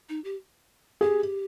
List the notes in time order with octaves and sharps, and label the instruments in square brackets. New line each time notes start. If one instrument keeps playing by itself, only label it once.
[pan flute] D#4
G4
[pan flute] G4 [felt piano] G#4